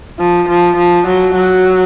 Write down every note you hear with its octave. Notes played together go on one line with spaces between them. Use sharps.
F3
F3
F3
F#3
F#3